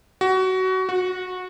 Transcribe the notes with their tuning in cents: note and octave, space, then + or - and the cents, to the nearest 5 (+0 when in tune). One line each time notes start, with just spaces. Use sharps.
F#4 +20
F#4 -20